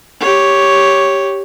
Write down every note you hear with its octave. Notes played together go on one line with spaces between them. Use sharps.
G4 C#5